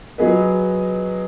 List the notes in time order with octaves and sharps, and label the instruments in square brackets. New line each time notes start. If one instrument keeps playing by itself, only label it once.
[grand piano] F#3 B3 G#4 B4 D#5